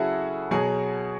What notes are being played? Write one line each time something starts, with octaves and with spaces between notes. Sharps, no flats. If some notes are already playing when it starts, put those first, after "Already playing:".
Already playing: C#3 F#3 E4 F#4 G#4 A4
B2 F#3 G#4